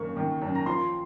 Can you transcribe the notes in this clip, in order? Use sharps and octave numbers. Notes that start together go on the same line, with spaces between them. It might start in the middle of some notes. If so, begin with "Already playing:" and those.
Already playing: F#2 D#3 A#3 C#6
D#3
F#2
A#5
F3 C6